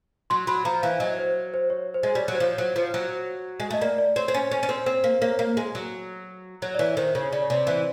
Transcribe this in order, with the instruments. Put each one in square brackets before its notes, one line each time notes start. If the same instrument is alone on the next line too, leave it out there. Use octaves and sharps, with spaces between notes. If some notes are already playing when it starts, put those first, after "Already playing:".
[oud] F#3 [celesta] C6
[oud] F#3 [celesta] B5
[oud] F3 [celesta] A#5
[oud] E3 [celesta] F5
[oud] F#3 [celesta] D#5
[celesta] C5
C5
C#5
C5
[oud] G#3
[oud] G3 [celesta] C#5
[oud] F#3
[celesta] C5
[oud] F3 [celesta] C#5
[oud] F#3
F3
F#3
G#3
[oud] A3 [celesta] D#5
[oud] A#3 [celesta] D5
[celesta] D5
[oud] C4 [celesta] C#5
[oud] C4
[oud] C#4 [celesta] C#5
[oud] C#4
C#4
C4
C4
A#3
[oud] A#3 [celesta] C#5
[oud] A#3
G#3
F#3
[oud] F#3 [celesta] C#5
[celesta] D5
[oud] E3 [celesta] C#5
[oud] D#3 [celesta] C5
[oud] C#3 [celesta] C#5
[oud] C#3 [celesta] D5
[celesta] C#5
[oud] C3 [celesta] D5
[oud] E3